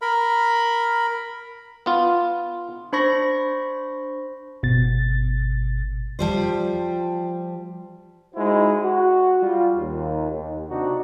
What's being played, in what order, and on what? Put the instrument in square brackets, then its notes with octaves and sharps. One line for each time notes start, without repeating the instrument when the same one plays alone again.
[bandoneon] A#4 B5
[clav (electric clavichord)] B3 F4
[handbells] D4 C5 B5 C#6 A#6
[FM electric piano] G1 B2 A6
[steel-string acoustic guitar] F3 G3 C5
[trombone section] G#3 D#4 E4 F#4 C5
F#4
G3 F4
D#2
D#2
C3 D4 D#4 F#4